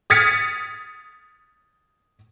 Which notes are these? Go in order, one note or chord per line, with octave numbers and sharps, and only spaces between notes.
D#6 F6 G#6 A6 B6 C#7